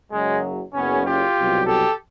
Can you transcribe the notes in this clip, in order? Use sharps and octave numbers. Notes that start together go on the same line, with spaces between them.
F#1 F#2 C#3 F#3 G#3
F#1 F#2 C#3 B3 C#4
F4 G4
C2 B2 F#3
G4 A4